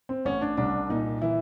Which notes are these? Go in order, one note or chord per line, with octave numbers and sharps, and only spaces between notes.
C4
A1 C#4
D4
C2 D4
A#2 D#4
E3 E4